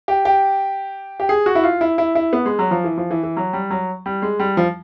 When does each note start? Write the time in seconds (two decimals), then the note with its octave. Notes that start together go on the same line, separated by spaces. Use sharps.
0.08 G4
0.25 G4
1.20 G4
1.29 G#4
1.46 F#4
1.55 E4
1.63 F4
1.81 E4
1.98 E4
2.15 E4
2.33 B3
2.45 G#3
2.59 F#3
2.71 F3
2.84 E3
2.97 F3
3.11 E3
3.23 E3
3.37 F#3
3.53 G3
3.71 F#3
4.06 G3
4.22 G#3
4.39 G3
4.57 F3